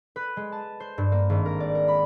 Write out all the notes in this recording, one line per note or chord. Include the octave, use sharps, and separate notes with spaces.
B4
G#3
A5
C5
G2
A#3
G#1
A#4
D5
A#4
B5